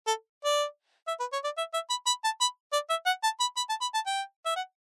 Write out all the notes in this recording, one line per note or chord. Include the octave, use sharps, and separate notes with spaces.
A4
D5
E5
B4
C#5
D5
E5
E5
B5
B5
A5
B5
D5
E5
F#5
A5
B5
B5
A5
B5
A5
G5
E5
F#5